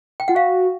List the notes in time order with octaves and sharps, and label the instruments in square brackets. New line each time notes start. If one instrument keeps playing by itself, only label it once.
[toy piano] G5
[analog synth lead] F4 [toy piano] F#5
[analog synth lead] F#4 [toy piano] F5